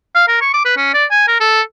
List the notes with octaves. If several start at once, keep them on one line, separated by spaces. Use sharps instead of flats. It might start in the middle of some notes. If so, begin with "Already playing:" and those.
F5
A#4
C#6
D6
B4
C#4
D5
G#5
A#4
A4